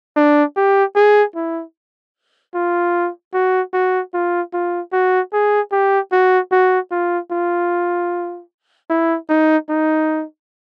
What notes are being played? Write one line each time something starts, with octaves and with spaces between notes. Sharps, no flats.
D4
G4
G#4
E4
F4
F#4
F#4
F4
F4
F#4
G#4
G4
F#4
F#4
F4
F4
E4
D#4
D#4